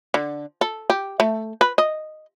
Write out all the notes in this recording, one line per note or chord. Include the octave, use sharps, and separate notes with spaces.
D3
A4
G4
A3
B4
D#5